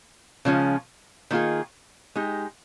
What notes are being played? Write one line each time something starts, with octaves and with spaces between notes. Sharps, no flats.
C#3 F3 G#3 C#4 F4
D#3 A#3 F4 G#4
G#3 D#4 G4